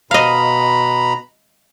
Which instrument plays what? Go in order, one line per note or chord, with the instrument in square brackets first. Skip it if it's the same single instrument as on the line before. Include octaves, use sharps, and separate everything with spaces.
[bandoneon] B2 A#5 B5 [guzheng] D#5 F5